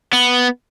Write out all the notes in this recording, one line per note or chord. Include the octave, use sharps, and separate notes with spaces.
B3